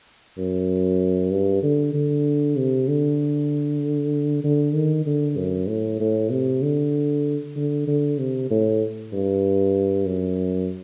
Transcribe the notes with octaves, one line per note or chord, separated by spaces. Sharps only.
F#2
G2
D3
D3
C3
D3
D3
D#3
D3
F#2
A2
A2
C3
D3
D3
D3
C3
A2
G2
F#2